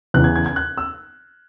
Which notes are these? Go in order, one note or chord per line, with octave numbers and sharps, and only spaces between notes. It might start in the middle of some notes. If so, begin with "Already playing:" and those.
E2 C#3 E3 F#6
G#6
G#6
G#6
F#6
E6